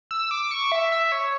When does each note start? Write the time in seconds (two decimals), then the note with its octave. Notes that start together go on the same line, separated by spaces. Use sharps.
0.11 E6
0.31 D6
0.51 C#6
0.72 E5
0.92 E5
1.12 C#5